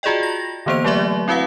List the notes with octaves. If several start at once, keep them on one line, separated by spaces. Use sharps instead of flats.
F4 F#4 G#4 D5 D#5 G5
A#6
D3 E3 A#3 B3 C5 F7
F#3 A3 G4 D5 E5
C4 E4 F#4 B4 F5 F#5